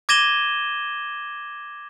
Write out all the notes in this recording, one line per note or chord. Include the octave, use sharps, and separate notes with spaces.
D6 G#6 A#6 D#7 E7 G7